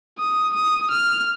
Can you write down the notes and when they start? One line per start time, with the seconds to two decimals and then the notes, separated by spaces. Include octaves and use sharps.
0.19 D#6
0.55 D#6
0.91 F6